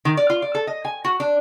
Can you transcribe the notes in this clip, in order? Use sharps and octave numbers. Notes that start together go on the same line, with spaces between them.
D#3
D5
F4
D5
A4
D#5
G#5
F#4
D4